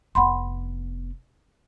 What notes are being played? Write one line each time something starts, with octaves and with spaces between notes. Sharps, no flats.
F1 B3 F#5 B5 C6